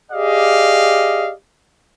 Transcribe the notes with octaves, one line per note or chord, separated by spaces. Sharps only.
G4 G#4 D5 D#5 F5